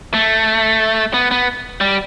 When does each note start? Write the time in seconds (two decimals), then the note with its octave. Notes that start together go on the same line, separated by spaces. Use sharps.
0.14 A3
1.14 B3
1.31 B3
1.81 G3